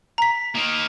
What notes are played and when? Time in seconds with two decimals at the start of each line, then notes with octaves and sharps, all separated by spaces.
0.18 A#5 B6
0.55 A#3 D#4